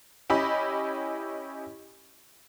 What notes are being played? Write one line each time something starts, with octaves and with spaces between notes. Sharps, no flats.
C#4 E4 G4 D#5 B5